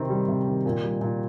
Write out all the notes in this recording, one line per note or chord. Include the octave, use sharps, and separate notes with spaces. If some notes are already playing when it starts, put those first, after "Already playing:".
Already playing: C3 D#3 C4
G3
C3
D#3
A#2
G3
A#2